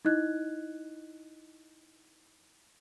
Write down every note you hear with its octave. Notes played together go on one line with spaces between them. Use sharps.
D#4 E4 D#5 F#6 G#6